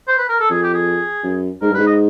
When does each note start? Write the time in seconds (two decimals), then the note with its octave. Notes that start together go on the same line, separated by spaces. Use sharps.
0.08 C5
0.18 B4
0.29 A#4
0.40 A4
0.50 F2 G#4
0.63 G4
0.74 G#4
1.24 F#2
1.62 G#2 A#4
1.70 G2
1.74 G#2 B4
1.87 D#5